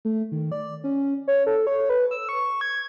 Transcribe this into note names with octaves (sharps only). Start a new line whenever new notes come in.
A3
D#3
D5
C#4
C#5
A4
C#5
B4
E6
C#6
G#6